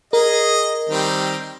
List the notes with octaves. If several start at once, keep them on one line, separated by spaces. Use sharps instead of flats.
G#4 A#4 D#5
D#3 G3 C4